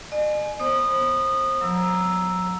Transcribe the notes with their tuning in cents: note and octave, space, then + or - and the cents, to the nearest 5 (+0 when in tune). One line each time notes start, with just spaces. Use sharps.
D#5 -45 G#5 +25
B3 +0 C5 +30 D#6 -20
F#3 -40 A#5 +0 E6 +0